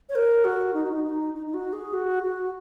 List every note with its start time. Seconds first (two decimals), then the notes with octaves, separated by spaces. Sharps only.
0.09 C#5
0.15 A#4
0.45 F#4
0.74 D#4
0.83 F#4
0.93 D#4
1.04 D#4
1.34 D#4
1.46 D#4
1.54 F#4
1.73 G#4
1.93 F#4
2.23 F#4